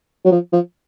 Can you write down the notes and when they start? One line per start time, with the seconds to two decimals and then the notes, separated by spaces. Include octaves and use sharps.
0.25 F#3
0.32 F3
0.53 F3